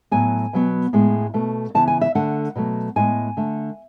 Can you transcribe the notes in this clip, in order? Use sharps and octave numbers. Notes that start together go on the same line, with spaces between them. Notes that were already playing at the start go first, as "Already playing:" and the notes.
A2 F#3 B3 G#5
B2 F#3 B3
A2 G#3 B3
B2 A3
C#3 E3 B3 A5
G#5
E5
D3 A3 F#5
B2 F#3 A3
A2 G#3 B3 G#5
D3 A3